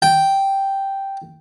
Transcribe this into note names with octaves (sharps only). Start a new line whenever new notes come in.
G5